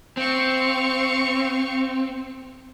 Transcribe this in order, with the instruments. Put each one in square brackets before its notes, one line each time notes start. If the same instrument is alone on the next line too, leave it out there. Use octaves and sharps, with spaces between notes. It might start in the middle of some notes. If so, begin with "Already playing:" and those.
[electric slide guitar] C4 [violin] F5 C#6